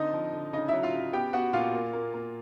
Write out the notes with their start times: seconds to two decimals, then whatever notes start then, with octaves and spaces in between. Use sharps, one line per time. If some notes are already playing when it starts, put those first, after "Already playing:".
Already playing: D3 C4 D#4 D#5
0.13 F3
0.33 D3
0.53 C#3 D#4 D#5
0.68 F#3 E4 E5
0.83 F4 F5
0.93 C#3
1.13 B3 G4 G5
1.33 B3 F#4 F#5
1.53 A#2 F4 F5
1.74 A#3
1.93 A#3
2.14 A#3